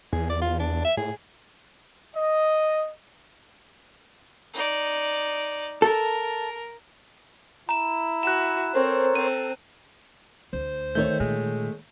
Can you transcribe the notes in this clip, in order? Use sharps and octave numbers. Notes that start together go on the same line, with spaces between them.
E2 G#4
D5
F4
D4
E5
A2 G#4
D#5
D#4 D5
A4 A#4
E4 A#5 E7
F#4 F#6 E7
C4 A4 A#4 C5 C#5
C4 D#7
D2 C5
D#3 A3 C#5 G6
A#2 G#3